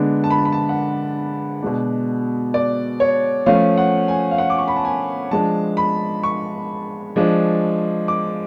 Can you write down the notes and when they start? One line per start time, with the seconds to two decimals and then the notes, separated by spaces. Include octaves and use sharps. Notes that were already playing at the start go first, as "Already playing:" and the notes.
Already playing: D3 G#3 B3 D4
0.24 A5
0.31 B5
0.38 A5
0.45 B5
0.52 A5
0.69 F#5
1.62 B2 G#3 D4
2.54 D5
3.00 C#5
3.46 F3 A3 C#4 F5
3.77 F#5
4.08 G#5
4.31 F5
4.38 F#5
4.50 D6
4.58 C#6
4.68 B5
4.76 A5
4.85 G#5
5.31 F3 G#3 D4 A5
5.77 B5
6.23 C#6
7.16 F3 G#3 D4
8.08 D6